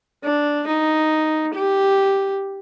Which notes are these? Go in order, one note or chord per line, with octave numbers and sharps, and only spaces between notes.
D4
D#4
G4